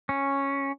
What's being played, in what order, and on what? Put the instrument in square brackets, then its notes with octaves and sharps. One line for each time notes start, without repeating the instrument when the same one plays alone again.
[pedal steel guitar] C#4